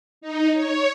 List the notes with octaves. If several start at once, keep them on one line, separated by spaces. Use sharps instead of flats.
D#4
C#5